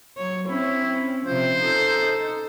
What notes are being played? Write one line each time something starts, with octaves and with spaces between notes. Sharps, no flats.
F#3 C#5
C4 C#4 E4
C3 F3 C5
D#4 A4